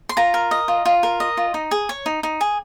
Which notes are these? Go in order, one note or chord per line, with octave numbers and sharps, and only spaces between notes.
C6
F4 A#5
A#4
D#5
F4
F4
A#4
D#5
F4
D#4
G#4
C#5
D#4
D#4
G#4